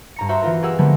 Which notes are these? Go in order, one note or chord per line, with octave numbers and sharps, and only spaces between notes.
G2 A#5 C#7
F#4 C5 E5 A#5 C6
E3 B3 F4 A#4
G4 G#4 A#4 F#5 E6
D3 F3 F#3 G#3 A#3 B3